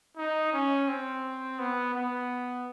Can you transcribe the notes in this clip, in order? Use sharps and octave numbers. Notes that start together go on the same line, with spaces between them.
D#4
C#4
C4
B3
B3